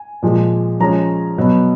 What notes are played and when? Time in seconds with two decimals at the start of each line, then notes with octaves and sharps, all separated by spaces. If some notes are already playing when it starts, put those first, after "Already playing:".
Already playing: G#5
0.22 A#2 F3 G#3
0.80 F3 G#3 C#4 A#5
1.38 B2 F#3 B3